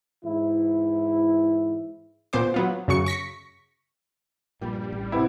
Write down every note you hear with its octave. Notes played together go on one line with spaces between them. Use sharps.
G#2 E3 E4
A#2 B3 C5 D6
F#3 B3 F4
F#2 C#3 F#3 C#6 C#7
C#6 A#6 B6 C#7
A#1 G2 A#2 G3
A1
C3 B3 E4